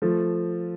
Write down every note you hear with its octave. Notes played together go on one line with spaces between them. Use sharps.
F3 A3